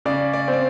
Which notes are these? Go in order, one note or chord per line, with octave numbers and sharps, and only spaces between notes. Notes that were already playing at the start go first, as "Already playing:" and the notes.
C#3 D5
D5
C4
D5